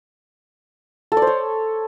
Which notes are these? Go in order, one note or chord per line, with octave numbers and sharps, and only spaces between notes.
A4
D5
C5
C#5